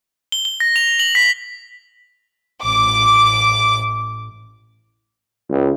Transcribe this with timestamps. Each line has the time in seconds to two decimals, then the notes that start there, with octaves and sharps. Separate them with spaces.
0.32 G7
0.45 G7
0.60 A#6
0.76 F7
0.99 F#7
1.15 B6
2.64 A1 D6
5.50 C#2